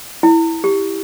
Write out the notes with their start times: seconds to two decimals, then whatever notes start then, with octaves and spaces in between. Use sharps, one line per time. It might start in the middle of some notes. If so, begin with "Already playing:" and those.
0.23 E4
0.64 G4